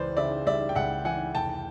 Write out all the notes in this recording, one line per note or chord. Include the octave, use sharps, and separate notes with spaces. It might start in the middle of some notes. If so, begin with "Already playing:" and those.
Already playing: C#2 E3 B4 C5 D5
C#3 D5 E5
G3 D5 E5
G5
C#2 E5 F#5
E3 F#5 G#5
F1 G5 A5